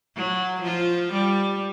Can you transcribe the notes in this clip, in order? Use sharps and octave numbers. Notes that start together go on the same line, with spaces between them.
F#3
F3 F4
G3